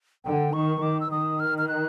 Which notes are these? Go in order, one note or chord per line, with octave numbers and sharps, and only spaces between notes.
D3 G5
D#3 C#6
D#3 D6
E6
D#3 D#6
F6
F6
F#6